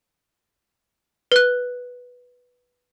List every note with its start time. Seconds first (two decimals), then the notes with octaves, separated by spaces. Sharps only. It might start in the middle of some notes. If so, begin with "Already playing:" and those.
1.32 B4 F#6